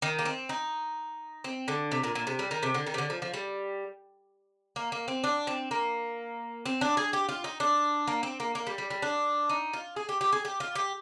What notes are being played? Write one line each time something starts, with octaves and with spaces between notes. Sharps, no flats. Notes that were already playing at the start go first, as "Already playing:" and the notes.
D#3
A#3
C4
D#4
C4
D3
C3
A#2
A#2
C3
G3
D#3
C3
D3
D#3
C3
D3
F3
F3
G3
A#3
A#3
C4
D4
C4
A#3
C4
D4
G#4
G4
F4
D#4
D4
A#3
C4
A#3
A#3
G3
G3
G3
D4
D#4
F4
G#4
G4
G4
G#4
G4
F4
G4